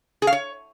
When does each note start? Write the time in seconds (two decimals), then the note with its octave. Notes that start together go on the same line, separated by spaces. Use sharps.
0.22 G#4
0.27 F5
0.32 C#5